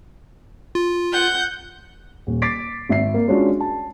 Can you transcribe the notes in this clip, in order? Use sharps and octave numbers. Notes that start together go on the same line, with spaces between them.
F4
F#5 G6
D#1
D6 A6 B6 C7 D7
G#1 E5 C7
A#3
G#3 C#4 D4 F4 F#4
A5